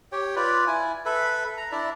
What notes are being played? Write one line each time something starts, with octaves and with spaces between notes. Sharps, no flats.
G4 C#5 G5
F4 B4 D5
E4 G#5
A4 B4 E5 B5
A#5
D4 E4 D5 E5